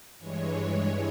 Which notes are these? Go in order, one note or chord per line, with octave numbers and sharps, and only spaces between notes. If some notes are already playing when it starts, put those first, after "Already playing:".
G2 E3 G#3 C#5